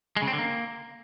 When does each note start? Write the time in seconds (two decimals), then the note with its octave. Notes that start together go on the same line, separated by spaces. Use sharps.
0.16 G#3
0.22 C#3
0.27 C4
0.33 D3
0.38 A#3